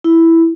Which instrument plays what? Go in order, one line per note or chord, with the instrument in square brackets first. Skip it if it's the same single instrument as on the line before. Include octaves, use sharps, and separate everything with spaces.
[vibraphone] E4